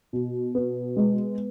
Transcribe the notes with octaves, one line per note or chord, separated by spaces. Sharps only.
B2
B3
G#3